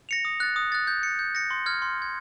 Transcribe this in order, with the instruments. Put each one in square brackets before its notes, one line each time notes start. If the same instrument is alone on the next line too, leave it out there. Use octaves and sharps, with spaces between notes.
[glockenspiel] A#6 C#7 F7
D#6
F#6 A6
D#6
F#6 A6
G6
A#6 C#7
G6
A#6 C#7
C6
F6 G#6
C6
F6 G#6